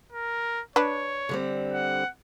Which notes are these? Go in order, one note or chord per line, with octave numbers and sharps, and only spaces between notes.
A#4
D4 B4 C#5
D3 G3 C4
F#5